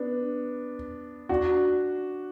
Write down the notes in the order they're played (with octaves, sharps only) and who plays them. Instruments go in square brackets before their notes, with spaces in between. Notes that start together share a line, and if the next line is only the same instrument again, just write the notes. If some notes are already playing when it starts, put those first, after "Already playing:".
Already playing: [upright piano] B3 D4
D4 F#4